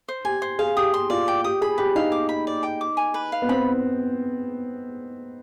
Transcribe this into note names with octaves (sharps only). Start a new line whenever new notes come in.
C5
G4 G#5
C5
G#4 F5
G4 D#6
C6
F4 D5
G5
G4 D#6
G#4 B5
G4 B4
D#4 F5
D6
B5
D5
G5
D6
G#5
B4
F5
B3
C4 B5